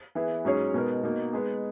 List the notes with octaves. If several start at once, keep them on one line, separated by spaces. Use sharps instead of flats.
E3 B3 E4 G#4
G#2 F#3 C#4 G#4 C#5
B2 G#3 B3 D#4 A#4
B2 A#3 D#4
G#3 B3 D#4 G#4